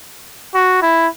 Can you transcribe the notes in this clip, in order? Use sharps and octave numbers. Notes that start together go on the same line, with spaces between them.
F#4
E4